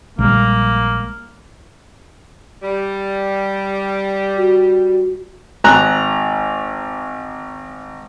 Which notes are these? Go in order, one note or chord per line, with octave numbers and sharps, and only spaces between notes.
A#1 G3 G#3 A#3
G3
F#4
G#1 A#5 F#6